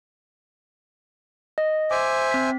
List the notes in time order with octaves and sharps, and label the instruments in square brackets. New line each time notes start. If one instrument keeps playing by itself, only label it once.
[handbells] D#5
[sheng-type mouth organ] C5 E5 G#5 [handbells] D6
[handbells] C4 B6